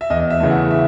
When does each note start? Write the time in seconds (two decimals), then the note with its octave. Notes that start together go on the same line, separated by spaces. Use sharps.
0.01 E5
0.10 E2 D#5
0.30 E5
0.40 C#3 E3 A3
0.50 F#5
0.71 E5